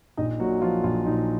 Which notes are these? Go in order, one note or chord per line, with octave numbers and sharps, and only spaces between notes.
A#1 D#4 D#5
A#2 F#3 F#4
F3 F4
A#1 F4
A#2 D#4